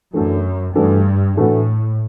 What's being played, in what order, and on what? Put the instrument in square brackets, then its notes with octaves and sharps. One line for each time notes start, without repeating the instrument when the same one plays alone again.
[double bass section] F#2 [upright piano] E3 A3 D4 F#4 A4
[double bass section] G2 [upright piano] E3 A3 D4 F#4 A4
[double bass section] A2 [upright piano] E3 A3 D4 F#4 A4